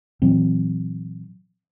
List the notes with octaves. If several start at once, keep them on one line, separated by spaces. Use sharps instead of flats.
A#2 E3 F#3 C4